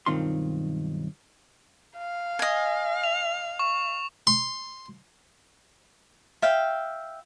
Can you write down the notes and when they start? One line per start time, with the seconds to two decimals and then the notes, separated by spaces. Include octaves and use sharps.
0.06 B1 G2 D#3 C4 F4 C6
1.98 F5
2.39 D#5 G#5
3.04 F7
3.59 C#6
4.27 C6
6.42 E5 F5 G5